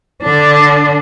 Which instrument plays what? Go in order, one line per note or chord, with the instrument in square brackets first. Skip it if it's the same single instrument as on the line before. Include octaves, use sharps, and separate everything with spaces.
[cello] D3 D4